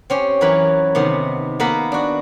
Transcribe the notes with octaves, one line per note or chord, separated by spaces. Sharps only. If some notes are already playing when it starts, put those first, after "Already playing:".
C4 C#4 G4
F#2 E3 A#4 B4 C#5 B5
C3 D#3 B3
A#3 B3 A#4 B4 B5
D4 F#4